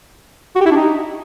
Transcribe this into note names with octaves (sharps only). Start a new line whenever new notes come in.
F#4
G4
E4
D4
D#4